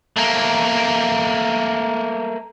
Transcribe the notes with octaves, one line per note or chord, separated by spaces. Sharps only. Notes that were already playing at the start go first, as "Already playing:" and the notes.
A3 A#3